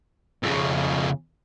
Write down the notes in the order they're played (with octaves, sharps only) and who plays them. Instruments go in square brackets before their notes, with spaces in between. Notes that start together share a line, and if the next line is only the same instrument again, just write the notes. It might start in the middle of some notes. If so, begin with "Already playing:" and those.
[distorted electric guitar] F2 C#3